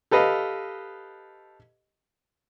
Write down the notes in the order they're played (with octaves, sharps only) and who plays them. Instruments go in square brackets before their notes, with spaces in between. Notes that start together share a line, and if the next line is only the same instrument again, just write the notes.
[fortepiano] G4 A4 B4 D#5 F5